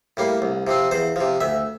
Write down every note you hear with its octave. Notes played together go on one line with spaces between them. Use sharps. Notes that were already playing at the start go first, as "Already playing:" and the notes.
A2 G3 A#3
C2
C3 F3 C4
E2 C5
C3 F3
D2 E5